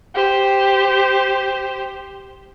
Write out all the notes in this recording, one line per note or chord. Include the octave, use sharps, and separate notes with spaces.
G4 C5